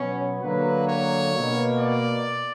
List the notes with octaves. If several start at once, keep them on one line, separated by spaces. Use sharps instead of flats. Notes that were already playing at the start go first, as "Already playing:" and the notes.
Already playing: B2 F#3 B3 C#4
D3 F#3 A#3 B4
C#5
B2 A#3
D5